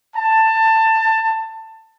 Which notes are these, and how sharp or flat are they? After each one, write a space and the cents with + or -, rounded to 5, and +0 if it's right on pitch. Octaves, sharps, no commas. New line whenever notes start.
A5 +20